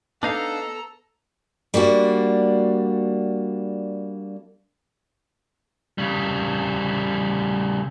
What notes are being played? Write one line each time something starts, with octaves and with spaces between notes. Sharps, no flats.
B3 D4 D#4 A4 F5 A#5
G3 A#3 D4 F#4
C#3 G3